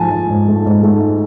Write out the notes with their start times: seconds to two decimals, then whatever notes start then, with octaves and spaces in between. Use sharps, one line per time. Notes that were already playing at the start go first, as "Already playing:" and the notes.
Already playing: G#2 F3 A3 G#5 A5
0.11 F3
0.29 G#2
0.48 A3
0.66 G#2
0.83 A3